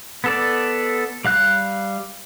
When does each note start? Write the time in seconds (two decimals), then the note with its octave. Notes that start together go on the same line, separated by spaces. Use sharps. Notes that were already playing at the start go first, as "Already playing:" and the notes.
0.24 B3 A4 D5
1.25 G3 F5 F#6